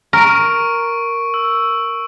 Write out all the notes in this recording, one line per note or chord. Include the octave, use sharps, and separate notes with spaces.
A#4 C#6 D7
E6